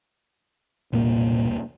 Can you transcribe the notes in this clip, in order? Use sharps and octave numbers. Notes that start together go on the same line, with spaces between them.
E1 C2 A#2 A#3